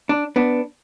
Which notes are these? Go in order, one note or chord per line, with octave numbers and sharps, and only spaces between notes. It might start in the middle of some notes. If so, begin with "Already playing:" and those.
D4
B3 D4